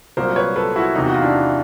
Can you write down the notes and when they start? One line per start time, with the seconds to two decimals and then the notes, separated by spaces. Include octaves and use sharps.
0.17 C2 A#2 F#3 A#3 A#4 C5
0.36 B4 C#5
0.56 A4 B4
0.76 E4 F#4
0.95 E2 C3 D#3 D#4
1.06 F#4
1.14 F4
1.22 D4 E4